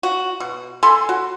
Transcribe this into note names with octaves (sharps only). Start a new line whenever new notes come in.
F#4
B2
A4 G#5 B5 C6
F#4